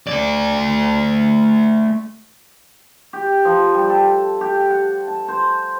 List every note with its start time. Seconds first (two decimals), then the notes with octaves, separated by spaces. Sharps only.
0.07 A3 D5
3.13 G4
3.45 F3
3.74 G3
3.89 A4
4.41 G4
4.70 F#5
5.08 A5
5.28 C5